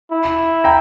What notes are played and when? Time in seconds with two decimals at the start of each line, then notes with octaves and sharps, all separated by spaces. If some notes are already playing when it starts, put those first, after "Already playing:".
0.11 E4
0.64 G5 A#5